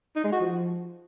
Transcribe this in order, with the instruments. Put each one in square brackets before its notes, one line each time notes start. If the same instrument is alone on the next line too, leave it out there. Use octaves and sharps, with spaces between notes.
[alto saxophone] D#4
G#3
F#4
F3